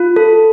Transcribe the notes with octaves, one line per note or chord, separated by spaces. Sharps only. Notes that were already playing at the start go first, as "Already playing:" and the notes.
Already playing: F4
A4